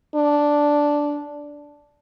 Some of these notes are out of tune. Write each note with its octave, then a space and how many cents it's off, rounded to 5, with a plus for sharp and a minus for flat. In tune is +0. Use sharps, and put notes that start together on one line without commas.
D4 -5